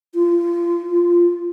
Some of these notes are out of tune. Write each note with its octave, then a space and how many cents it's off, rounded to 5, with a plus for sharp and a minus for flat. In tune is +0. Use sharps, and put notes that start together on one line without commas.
F4 -25
F4 -5